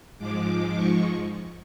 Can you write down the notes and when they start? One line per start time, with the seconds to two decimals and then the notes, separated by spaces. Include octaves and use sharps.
0.19 G#2 F3 G#3 D6
0.75 C#6